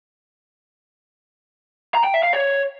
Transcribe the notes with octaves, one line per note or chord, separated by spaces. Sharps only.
A#5
G5
E5
F5
C#5